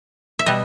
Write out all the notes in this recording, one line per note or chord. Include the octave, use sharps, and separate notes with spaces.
E5
B2 G3 B3 D#5